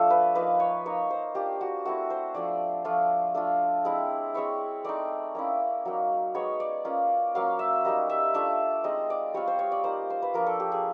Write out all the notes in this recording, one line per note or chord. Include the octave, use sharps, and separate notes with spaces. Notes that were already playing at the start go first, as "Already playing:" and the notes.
Already playing: F3 A3 D4 F4 A4
B4
F3 A#3 D#4 B4
C#5
A#3 D#4 C#5
C5
A#3 D4 F4 G4
F#4
A3 C4 E4 F#4
C5
F3 A3 D4 D5
F3 A3 D4 F4
A3 D4 F4
G#3 C4 E4
G#3 C4 E4 C#5
A3 C4 D#4 D5
A#3 C#4 E4
F#3 A#3 D#4
G#3 B3 D#4 C#5
D5
A#3 C#4 F4
F#3 A#3 C#4 F5
E5
G3 A#3 D#4 D#5
E5
A3 D4 F4 E5
G#3 C4 D#4 D#5
D5
G3 C4 F4 C#5
C5
C#5
D5
A#3 D#4 C5
C5
B4
F3 A#3 D4 F4 A#4
A4
G4
G#4